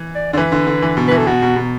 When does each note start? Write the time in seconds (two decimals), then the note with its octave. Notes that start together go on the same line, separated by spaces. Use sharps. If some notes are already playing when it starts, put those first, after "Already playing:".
Already playing: E3
0.15 D5
0.33 D3 D5
0.37 E3 B4
0.52 D3
0.67 D3
0.82 E3
0.97 B2
1.08 E3 B4
1.18 A4
1.26 B2 F#4
1.42 B2
1.56 B2